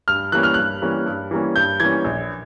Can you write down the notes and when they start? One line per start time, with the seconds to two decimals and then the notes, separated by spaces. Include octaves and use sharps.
0.08 G2 F6
0.32 E3 G3 A#3 C#4 F#6
0.43 F6
0.54 G2 F#6
0.82 E3 G3 A#3 C#4
1.06 G2
1.31 E3 G3 A#3 C#4
1.56 G2 G6
1.80 E3 G3 A#3 C#4 G#6
2.05 A#1